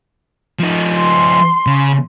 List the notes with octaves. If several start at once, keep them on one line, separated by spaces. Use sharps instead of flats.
F3 D#4
C6
C#3